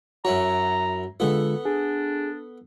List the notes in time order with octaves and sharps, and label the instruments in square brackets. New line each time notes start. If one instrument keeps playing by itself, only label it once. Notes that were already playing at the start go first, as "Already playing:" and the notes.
[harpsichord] F#2 E4 C#5 [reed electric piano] F#4 [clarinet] A#5
[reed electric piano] D3 G#3 F4 [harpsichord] B3 A4
[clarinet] D4 [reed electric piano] G#4